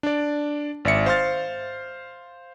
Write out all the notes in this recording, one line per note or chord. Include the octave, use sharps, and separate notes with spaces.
D4 D5
G#1 D5 E5 C#7
C5 F5 C6 F6 A6